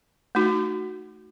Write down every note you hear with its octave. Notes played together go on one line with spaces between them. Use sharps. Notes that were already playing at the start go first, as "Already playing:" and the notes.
A3 D#4 F#4